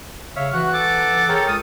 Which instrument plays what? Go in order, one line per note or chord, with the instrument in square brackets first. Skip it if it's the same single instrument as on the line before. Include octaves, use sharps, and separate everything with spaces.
[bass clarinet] C#3 [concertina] C#5 E5 F5
[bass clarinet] E3 [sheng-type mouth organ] F#4 [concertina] F#5
[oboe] A4 [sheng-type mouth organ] D6
[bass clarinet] G#4 [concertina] A#4 C#5 G5
[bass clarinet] C#2 [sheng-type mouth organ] D#6